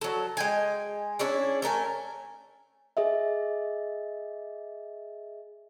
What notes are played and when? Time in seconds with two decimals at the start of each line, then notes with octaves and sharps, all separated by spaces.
0.01 F#3 A4
0.37 G#3 G5 G#5
1.19 C#4 D4 E4 G#4
1.62 A3 A4 A#4 G#5
2.97 G#4 D#5 E5